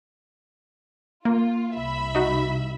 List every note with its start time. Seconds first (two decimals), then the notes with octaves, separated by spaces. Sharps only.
1.25 A#3 F4
1.75 C2 E5 B5
2.15 D#4 F#4